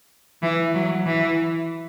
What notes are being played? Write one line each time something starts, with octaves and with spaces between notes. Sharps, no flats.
E3
F#3
E3